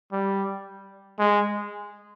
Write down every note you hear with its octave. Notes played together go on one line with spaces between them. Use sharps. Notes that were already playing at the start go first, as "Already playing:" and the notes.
G3
G#3